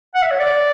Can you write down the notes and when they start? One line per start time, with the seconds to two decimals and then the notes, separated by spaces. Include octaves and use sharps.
0.15 F#5
0.23 E5
0.31 C#5
0.40 D5